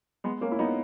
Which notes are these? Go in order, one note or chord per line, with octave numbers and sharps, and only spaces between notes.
G#3 B3
A#3 C#4
E4
B3 D#4